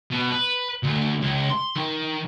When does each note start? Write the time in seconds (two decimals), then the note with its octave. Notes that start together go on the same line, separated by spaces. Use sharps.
0.11 B2
0.31 B4
0.83 D2
1.21 C#2
1.51 C6
1.76 D#3